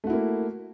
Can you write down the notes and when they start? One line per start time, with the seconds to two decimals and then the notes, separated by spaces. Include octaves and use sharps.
0.04 A3
0.07 F#4
0.10 E4
0.13 A#3